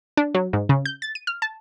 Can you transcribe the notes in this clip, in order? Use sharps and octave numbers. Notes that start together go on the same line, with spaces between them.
D4
F#3
G#2
C#3
G6
A6
D#7
F6
A5